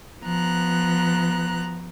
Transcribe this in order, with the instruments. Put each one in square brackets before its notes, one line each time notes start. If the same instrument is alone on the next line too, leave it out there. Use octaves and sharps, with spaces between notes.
[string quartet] F3 B3 A#5 F#6